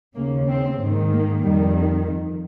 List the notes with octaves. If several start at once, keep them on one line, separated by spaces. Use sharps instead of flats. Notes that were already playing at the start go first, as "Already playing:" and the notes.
D#2 C#3 A#3
C4
G#2 D#3
A#3
F2 D#3 G3